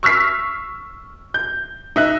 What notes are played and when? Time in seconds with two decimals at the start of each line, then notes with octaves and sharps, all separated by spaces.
0.03 C#6 E6 F6 B6 C7
1.34 G6
1.96 D#4 E5 F#6